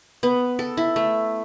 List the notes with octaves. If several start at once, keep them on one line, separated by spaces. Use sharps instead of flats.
B3
A4
E4
A3